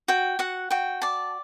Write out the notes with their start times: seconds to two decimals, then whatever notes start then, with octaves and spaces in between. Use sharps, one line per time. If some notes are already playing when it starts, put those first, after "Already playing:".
0.08 F#4 G5
0.39 F#4 F#5
0.71 F#4 G5
1.02 D5 A5